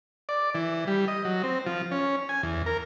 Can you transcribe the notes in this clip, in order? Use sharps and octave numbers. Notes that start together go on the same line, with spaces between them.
D5
E3
G3
D#5
F#3
C4
F3
C#4
G#5
E2
A#4